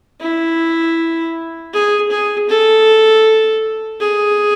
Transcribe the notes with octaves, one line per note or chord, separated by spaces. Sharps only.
E4
G#4
G#4
A4
G#4